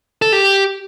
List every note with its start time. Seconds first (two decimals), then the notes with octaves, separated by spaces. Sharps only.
0.22 A4
0.32 G4